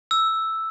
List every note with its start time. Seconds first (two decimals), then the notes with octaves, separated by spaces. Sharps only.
0.11 E6